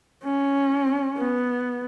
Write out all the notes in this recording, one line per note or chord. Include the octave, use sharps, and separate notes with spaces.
C#4
B3